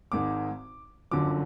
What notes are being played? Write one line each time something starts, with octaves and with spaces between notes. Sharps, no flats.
G#1 G#2 D#3 D6
G1 F#2 D3 F3 D6